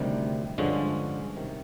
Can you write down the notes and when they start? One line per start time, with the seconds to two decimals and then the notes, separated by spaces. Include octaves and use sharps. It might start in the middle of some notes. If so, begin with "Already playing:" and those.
Already playing: D2 C3 D#3 G3
0.58 G2 D3 F3 G#3 C#4
1.36 C3 D#3